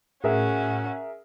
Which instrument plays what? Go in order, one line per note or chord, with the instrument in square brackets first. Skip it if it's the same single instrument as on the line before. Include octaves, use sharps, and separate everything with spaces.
[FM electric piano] A2 [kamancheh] C#4 F#4 [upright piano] G#4 A#4 E5